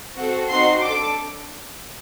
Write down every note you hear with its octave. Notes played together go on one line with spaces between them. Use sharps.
C4 F#4 A4
C4 D#4 F#4 C6
D4 A4 D6